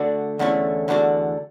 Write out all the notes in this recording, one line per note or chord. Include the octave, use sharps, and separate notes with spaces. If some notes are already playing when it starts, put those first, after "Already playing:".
Already playing: D3 A3 D4 F#4
E2 D3 A3 C#4 E4
E2 D3 A3 D4 F#4